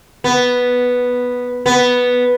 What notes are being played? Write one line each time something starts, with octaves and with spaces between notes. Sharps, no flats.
B3
B3